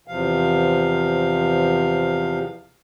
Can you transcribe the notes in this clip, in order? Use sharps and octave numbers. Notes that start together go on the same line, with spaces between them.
E2 C3 F3 F5